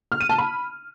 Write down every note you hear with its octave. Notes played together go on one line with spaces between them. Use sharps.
F6
D#7
A5
B5